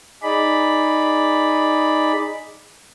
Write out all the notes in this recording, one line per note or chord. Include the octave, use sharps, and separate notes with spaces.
D#4 G#4 D5 B5